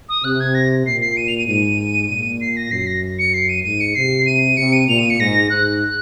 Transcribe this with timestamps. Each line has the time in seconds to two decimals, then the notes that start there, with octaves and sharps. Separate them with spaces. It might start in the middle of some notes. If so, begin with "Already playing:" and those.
0.09 D#6
0.24 C3 F#6
0.40 G#6
0.55 A#6
0.86 A#2 C7
1.01 C7
1.17 D#7
1.28 F7
1.38 D#7
1.48 G#2 D#7
2.10 A#2
2.41 C7
2.57 A#6
2.71 F#2 C7
2.87 A#6
3.19 C#7
3.34 C7
3.49 D#7
3.64 G#2 D#7
3.80 C#7
3.95 C3 C7
4.26 D#7
4.57 C3 C#7
4.73 D#7
4.88 A#2 F7
4.99 D#7
5.10 C#7
5.20 G#2 A#6
5.50 G#2 F#6